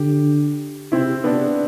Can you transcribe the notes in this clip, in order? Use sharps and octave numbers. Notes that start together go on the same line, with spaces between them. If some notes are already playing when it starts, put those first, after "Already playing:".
Already playing: D3 G4
C3 C4 E4
C3 B3 D4